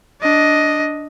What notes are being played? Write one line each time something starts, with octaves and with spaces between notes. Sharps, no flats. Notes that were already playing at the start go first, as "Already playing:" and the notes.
D4 D#5